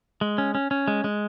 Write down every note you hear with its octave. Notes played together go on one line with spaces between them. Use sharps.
G#3
C#4
C#4
C#4
G#3
G#3